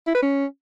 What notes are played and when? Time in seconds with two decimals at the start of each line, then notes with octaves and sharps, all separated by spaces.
0.07 E4
0.15 B4
0.22 C#4